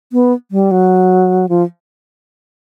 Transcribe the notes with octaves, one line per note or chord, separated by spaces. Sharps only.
B3
G3
F#3
F3